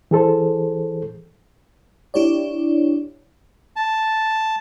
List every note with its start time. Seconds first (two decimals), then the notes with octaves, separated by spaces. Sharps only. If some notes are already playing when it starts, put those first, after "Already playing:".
0.11 E3 G#4 A4 C5
2.14 D4 E4 G4 C#5 D5
3.76 A5